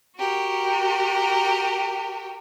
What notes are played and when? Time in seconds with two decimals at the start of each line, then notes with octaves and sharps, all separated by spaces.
0.18 F#4 G4 A#4